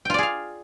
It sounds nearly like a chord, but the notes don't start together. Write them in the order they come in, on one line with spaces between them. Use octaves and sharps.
G5 F4 D5 G#4 F5